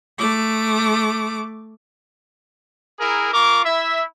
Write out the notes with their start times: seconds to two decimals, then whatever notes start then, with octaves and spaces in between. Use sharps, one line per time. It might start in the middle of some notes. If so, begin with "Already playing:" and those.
0.19 A3 D6
3.00 E4 G#4 A#4
3.33 F4 A#4 C#6 D6
3.65 E4 E5